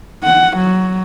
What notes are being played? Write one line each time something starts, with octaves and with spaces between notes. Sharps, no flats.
F#5
F#3